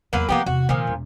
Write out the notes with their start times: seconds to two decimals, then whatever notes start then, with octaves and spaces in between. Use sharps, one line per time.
0.13 E2 D3 F#3 A#3 B4
0.28 E3 F3 A#3 B3 G4
0.46 E2 C3 F#4
0.69 A#2 D#3 F3
0.87 E1